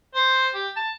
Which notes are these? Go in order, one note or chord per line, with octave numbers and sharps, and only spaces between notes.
C5
G4
A5